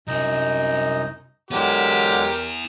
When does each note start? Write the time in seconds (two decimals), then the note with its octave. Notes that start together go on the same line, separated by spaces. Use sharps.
0.08 C2 F#2 D#4 D#5
1.51 D3 F#3 G#3 B3 E4 G4 A#4